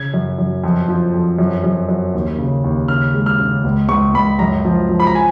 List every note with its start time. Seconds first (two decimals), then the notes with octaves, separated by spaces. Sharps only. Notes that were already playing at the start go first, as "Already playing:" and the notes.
Already playing: C#3 G#6
0.14 F#2
0.38 F#2
0.64 F2
0.88 F3
1.14 F2
1.38 F#2
1.64 F#2
1.89 F#2
2.14 D#2
2.38 C#3
2.64 D#2
2.88 C#3 F6
3.14 G#3
3.26 F6
3.39 C#3
3.64 C#2
3.89 C#2 C#6
4.14 C#2 B5
4.39 F#2 A#5
4.65 F3
4.89 F3
5.00 B5
5.07 A#5
5.15 G#5